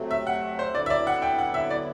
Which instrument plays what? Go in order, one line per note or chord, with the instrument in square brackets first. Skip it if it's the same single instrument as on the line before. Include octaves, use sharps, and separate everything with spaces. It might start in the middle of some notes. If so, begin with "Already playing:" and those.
Already playing: [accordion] C3 F#3 A3
[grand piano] E5
F#5
C5
[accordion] D3 F#3 B3 E4 [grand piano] D5
[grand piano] E5
D5
F#5
G5
F#5
E5
D5